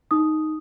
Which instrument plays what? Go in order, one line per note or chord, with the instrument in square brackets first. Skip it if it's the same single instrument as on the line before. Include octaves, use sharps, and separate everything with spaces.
[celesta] D#4 D#6